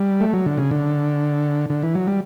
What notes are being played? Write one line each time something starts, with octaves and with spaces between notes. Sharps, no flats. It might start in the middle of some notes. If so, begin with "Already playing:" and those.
Already playing: G3
A3
F#3
D3
C#3
D3
D3
E3
F#3
G3